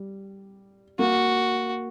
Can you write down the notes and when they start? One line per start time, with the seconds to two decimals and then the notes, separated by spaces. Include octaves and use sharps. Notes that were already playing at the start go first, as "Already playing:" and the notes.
Already playing: G3
0.99 A#3 F#4